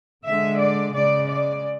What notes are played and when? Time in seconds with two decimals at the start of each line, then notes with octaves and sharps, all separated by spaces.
0.25 D3 G#3 E5
0.59 D5
0.93 C#3 G#3 D5
1.28 D5